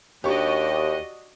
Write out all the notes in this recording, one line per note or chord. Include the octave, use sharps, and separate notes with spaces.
D#2 D4 F#4 G4 D#5 C#6